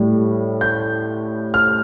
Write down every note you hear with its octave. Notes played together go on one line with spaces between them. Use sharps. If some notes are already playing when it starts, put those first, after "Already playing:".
Already playing: A2 G3
G6
F6